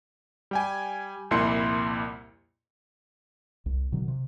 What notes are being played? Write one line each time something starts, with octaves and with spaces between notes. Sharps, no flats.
G3 G5 G#5
C2 F2 A#2 E4 C6 C#7
C2
B2 D3 D#3 F#3
C3